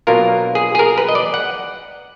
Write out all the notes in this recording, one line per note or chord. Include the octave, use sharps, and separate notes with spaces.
B2 F#3 A#3 D4 F4 A#4
G#4
G#4
A#4
B4
D#5
D5
F#5